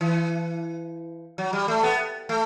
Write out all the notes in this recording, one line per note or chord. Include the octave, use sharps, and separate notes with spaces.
E3
F#3
G3
A3
B3
A3